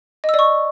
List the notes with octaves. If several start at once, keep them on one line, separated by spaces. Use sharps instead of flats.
D#5
E6
D5
C#6